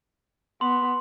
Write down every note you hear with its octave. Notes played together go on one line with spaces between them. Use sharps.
B3 C6